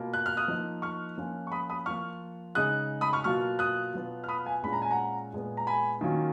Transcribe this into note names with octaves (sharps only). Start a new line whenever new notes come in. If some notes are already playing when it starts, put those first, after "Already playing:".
Already playing: B2 A#3 F4
F#6
F6
D#6 F#6
F3 A#3 D#4
C#6 F6
F3 A#3 C#4 F4
C#6
B5 D#6
B5 D#6
F3 A#3 F4 C#6 F6
C#3 G#3 D#4 D#6 F#6
B5 D#6
C#6 F6
B2 F#3 A#3 F4 C#6 F6
D#6 F#6
B2 F#3 B3 F4
F6
B5 D#6
F5 G#5
A#2 G#3 C#4 F4 B5
A#5
G#5
F#5 A#5
A#2 G#3 B3
A#5
G#5 B5
D#3 F#3 A#3 C#4 F4